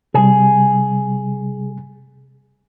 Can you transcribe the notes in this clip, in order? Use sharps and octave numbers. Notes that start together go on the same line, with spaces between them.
C3 G3 G#4